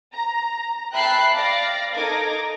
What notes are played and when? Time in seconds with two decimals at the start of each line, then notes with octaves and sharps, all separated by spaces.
0.14 A#5
0.94 E5 G5 A5 B5 F#6 C7
1.33 D5 F5 A#6
1.92 D#4 A4 A#4 D6 G#6 A#6